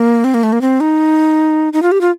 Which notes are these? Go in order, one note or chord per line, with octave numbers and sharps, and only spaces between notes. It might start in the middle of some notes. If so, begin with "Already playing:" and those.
Already playing: A#3
C4
A#3
A3
A#3
C4
D#4
D#4
F4
G4
F4